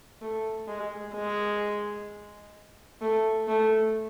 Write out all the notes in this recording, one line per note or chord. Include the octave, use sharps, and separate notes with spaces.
A3
G#3
G#3
A3
A3